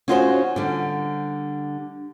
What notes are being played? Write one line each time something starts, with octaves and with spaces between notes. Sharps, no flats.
C#4 D#4 F4 F#4 B4 C5
D3 G3